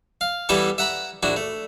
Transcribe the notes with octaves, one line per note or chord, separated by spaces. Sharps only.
F5
E3 G3 B3 E4 G4 A4
E5 F#5 A#5 B5
A#1 D4 E4 F#4
A3